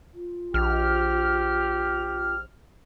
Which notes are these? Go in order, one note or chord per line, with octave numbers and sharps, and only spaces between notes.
F4
A#1 G4 F6